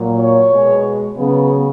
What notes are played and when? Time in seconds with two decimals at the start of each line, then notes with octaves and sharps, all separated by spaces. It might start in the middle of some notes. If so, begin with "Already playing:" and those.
Already playing: A#2 F#3
0.15 C#5
0.48 B2 G#3
1.15 C#3 F#3 B3